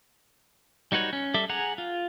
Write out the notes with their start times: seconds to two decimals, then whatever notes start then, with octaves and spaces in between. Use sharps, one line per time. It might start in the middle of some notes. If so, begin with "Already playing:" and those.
0.92 G3 D#4 F#4 B4 C#5
1.13 C#4
1.34 G3 A4 E5 D6
1.49 G#4 F#5 G#5 A#5
1.78 F4